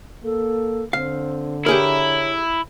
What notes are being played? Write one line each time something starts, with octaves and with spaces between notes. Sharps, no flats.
A#3 A4
D3 C4 F5
E4 G4 G#4 A#4 C#5